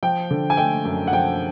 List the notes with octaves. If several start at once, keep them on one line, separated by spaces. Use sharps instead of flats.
F3 G5
D3
G#5
A3 G5
F#2
F#5
F3 G5